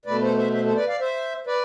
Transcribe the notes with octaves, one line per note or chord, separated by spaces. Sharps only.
B2 A3 B4 D5
A4 C5
C5 E5
C5 E5
A4 C5
B4 D5
D5 F5
C5 E5
B4 D5